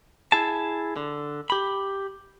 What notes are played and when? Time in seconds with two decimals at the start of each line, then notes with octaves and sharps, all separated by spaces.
0.32 E4 G#4 A5
0.96 D3
1.50 G4 B5